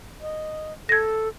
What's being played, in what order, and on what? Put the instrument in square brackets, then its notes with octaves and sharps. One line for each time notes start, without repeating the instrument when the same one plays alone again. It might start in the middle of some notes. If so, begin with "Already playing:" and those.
[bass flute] D#5
[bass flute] A4 [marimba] G#6 A#6